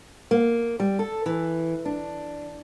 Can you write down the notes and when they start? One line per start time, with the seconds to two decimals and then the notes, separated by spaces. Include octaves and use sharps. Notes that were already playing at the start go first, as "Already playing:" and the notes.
0.31 A#3
0.80 G3
0.99 A4
1.26 E3
1.85 D4